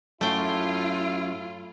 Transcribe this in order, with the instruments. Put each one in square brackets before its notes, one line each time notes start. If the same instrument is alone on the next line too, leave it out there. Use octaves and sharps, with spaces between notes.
[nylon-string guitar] F#2 [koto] A3 G5 [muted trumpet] E4 [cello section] F4